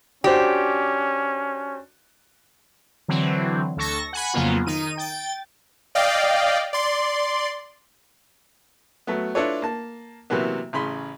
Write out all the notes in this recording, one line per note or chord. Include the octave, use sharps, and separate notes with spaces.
C#4 D4 F#4 G4 C5
D3 E3 F#3 C4
D2 A4 C#6 A#6
F#5 G#5 B5
F2 C#3 F#3 A#3 B3 F4
D#3 D#4 D#7
G5 A6
D5 D#5 F5 G5
D5 C6
F#3 A3 B3
D4 E4 F4 A4 B4 C#5
A#3 A5
C3 E3 F#3 A#3 B3
A1 C#3 B5 C6